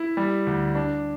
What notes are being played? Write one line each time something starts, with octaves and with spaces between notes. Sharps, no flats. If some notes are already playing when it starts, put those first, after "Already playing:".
Already playing: E4
G3
D2
D4